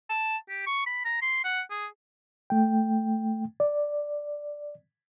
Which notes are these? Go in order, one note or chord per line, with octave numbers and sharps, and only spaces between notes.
A5
G4
C#6
B5
A#5
C6
F#5
G#4
A3 G5
D5